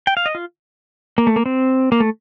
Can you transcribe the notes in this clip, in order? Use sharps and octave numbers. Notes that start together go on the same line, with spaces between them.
G5
F5
D#5
F4
A#3
A3
A#3
C4
A#3
A3